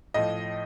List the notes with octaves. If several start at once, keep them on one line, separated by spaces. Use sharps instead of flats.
A2 F3 D#5